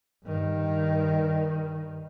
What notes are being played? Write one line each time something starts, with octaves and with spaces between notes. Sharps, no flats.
G2 D#3